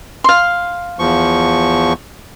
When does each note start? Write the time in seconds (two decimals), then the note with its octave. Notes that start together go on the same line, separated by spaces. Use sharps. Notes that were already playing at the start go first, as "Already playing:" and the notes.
0.24 F5 C6
0.99 E2 F3 C#6